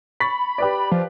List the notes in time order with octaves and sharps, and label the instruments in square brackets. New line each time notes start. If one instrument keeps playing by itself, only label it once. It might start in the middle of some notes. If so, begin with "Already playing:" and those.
[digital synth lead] B5 [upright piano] C#6 A6 B6
[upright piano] G4 B4 D5
[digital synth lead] F3